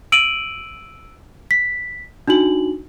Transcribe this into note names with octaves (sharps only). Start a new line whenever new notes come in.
E6 D7 D#7 F#7
B6
D4 D#4 F#4 F#7